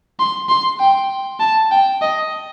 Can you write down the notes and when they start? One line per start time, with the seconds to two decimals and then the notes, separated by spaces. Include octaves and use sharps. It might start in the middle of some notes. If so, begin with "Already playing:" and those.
0.19 C6
0.49 C6
0.80 G5
1.40 A5
1.71 G5
2.01 D#5